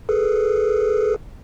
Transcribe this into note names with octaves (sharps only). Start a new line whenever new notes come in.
G#4 A4 B4